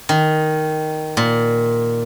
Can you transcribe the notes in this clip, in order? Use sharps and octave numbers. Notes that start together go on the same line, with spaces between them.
D#3
A#2